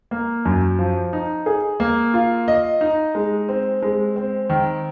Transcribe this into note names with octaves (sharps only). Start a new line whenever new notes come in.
A#3
F#2
F3
D#4
G#4
A#3
F4
D#5
D#4
G#3
C4
G#3
C4
D#3